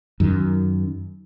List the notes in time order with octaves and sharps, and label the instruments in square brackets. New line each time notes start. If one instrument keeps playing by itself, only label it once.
[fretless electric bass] F#2 D#3